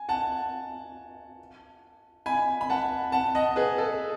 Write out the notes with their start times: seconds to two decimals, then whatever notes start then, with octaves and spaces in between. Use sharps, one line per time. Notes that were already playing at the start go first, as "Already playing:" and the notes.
Already playing: G#5
0.09 F#5 A5
2.26 G#5 B5
2.61 B5
2.70 F#5 A5
3.12 F#5 A5
3.35 D#5 F#5
3.56 G#4 B4
3.78 A4